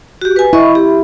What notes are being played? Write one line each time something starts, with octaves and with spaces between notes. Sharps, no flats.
F#4 G4
B4 G#5
E4 D#5 C#6
G4